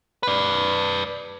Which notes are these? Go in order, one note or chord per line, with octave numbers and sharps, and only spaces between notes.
B4 D5